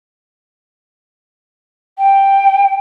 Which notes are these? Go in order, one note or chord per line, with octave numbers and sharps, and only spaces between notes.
G5